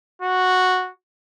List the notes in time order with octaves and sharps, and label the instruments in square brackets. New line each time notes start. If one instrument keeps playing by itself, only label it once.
[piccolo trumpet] F#4